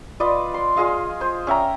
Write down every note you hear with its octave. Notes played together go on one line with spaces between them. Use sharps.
F4 B4 D5 D#5
C6
F4 G#4 D#5 F5
C5
C#4 E5 G5 A#5